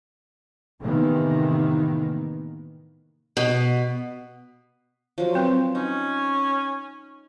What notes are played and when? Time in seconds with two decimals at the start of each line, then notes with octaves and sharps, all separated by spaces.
0.81 A2 C3 D#3 E3 A#3 B3
3.37 B2
5.18 F3 F#3
5.34 F3 F#3 C4 B4
5.75 C#4 D#4